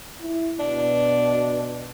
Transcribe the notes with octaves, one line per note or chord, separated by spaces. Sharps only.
E4
B2 D4